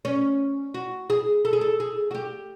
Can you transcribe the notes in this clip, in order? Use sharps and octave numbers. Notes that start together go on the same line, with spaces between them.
C#4
F#4
G#4
A4
G#4
A4
G#4
F#4
G4